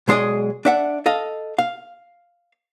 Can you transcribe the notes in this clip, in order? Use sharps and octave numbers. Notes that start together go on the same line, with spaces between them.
B1 G#3 G#4 D5 D#5
D4 E5 F#5
A4 D#5 F5
F5